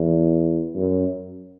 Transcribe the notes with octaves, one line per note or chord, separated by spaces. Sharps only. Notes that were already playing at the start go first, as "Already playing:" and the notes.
Already playing: E2
F#2